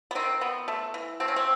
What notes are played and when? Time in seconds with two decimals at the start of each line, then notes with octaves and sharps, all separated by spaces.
0.11 B3
0.15 D#3 C4
0.41 B3
0.68 A3
0.94 E3
1.20 A3 C4
1.28 C#4
1.36 C4